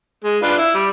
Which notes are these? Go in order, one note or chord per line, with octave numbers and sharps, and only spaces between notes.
G#3
D4 F4 B4
E4
G3